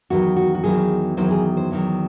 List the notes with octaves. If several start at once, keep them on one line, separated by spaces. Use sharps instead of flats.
E2 D#3 F#3 F#4
F#4
F#4
E2 D#3 F#3 G#4
E2 D#3 F#3 C5
G#4
C5
E2 D#3 F#3